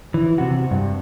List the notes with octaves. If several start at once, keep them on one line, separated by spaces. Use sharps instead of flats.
E3
C3 F#4
G2